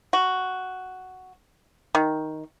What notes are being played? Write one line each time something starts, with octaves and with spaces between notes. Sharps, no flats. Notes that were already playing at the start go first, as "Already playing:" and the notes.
F#4
D#3